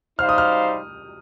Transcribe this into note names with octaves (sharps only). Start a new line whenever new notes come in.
G3 D#4 C5 F5 F6
D#6
F6